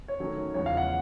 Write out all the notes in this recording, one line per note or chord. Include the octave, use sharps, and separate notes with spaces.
C#5
D#3 F#3 A3 C#4
E2 C#3 F3 G#3 C#5
F5
F#5